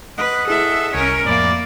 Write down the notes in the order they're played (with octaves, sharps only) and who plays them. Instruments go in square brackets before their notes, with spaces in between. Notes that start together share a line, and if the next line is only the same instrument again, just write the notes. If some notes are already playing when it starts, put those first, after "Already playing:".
[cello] B4 [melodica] D#5 F#5
[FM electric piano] E4 G#4 [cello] A4 E5
[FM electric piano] C2 B6 [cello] C#4 A#4 [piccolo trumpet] G#5
[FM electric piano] F2 A2 [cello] A#3 [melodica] E4 [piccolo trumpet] D5